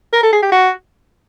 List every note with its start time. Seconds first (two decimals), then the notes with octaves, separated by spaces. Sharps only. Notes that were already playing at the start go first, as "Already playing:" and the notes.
0.13 A#4
0.23 A4
0.33 G#4
0.42 G4
0.52 F#4